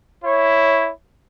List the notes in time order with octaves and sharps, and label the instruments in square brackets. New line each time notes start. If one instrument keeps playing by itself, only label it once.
[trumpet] E4 [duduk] C#5